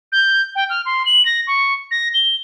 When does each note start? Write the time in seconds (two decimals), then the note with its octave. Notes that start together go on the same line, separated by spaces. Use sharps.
0.12 G6
0.56 G5
0.70 F6
0.86 C6
1.06 F#7
1.25 A#6
1.47 C#6
1.91 A#6
2.14 G7